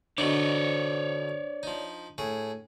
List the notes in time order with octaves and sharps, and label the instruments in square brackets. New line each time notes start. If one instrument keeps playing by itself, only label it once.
[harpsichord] B2 D3 D#4 [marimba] D4 [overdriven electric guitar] C#5 D5
[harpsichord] F3 D#4
A2 G#4